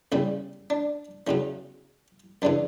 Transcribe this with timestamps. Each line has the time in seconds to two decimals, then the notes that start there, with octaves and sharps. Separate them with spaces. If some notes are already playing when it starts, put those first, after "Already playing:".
0.12 E2 C#3 G3 C#4
0.70 D4
1.27 E2 C#3 F#3 C#4
2.42 F#2 C#3 E3 D4